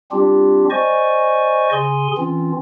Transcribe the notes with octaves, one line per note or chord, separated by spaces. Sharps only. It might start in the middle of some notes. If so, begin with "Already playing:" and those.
G3 C4 D4 F4 G4
C5 D5 D#5 G#5 C#6
C#3 G#4 G#5 C6
E3 C4 C#4 F4